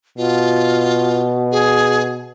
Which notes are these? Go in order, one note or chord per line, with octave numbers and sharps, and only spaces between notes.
B2 F4
G#4